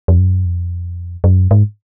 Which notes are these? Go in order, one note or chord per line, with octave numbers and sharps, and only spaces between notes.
F2
F#2
F2
F#2
G#2